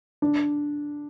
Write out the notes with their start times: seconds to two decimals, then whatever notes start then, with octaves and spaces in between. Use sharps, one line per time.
0.22 D4